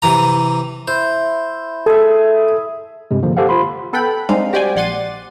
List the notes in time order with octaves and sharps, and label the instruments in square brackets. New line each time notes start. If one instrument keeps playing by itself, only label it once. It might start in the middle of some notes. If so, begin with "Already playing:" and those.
[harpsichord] C3 E3 A#5
[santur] E4 [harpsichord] C5
[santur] G#4 E5 [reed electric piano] A4
[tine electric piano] G2 C3 G#3
D3 F3 A#3
G4 A4 C5 F5 F#5
F4 C5 B5 C6
[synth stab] B3 A4 B4 G5 B5
G3 G#3 C4 D4 D#4 F5
F#4 G4 C5 D5 G5 G#5
A#1 D5 F#5 C6 A6 D#7